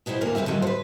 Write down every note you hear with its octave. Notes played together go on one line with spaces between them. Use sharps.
B2 F#3 G3 E4 C5
D2 D3 A#3 A#4
C#3 G3 C4 C5 E5
D3 D#3 F#3 G3 F4
B4 C5